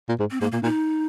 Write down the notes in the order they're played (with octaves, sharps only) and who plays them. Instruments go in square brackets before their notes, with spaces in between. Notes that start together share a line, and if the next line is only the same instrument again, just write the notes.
[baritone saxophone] A#2
G#2
[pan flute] C4
[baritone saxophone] G#2 [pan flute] A#3
[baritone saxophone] A#2 [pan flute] A#3
[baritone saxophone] A#2 [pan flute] D#4